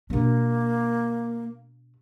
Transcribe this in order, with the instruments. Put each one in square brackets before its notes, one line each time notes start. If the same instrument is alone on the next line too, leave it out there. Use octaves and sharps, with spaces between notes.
[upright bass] B2 D4 [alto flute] A#3